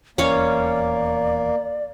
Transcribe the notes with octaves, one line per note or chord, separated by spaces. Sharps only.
D#1 E2 A#3 C#4 C#5 D5 F5